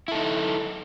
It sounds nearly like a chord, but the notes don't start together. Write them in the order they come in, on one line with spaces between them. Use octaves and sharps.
E4 A4 D#4